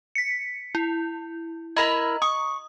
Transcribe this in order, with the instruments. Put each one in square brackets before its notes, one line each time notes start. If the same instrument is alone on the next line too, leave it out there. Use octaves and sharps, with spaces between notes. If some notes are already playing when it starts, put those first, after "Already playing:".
[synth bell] B6 C#7
E4
[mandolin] E4 A#4 B5 [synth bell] D#5 A#5
[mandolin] C#6 [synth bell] D#6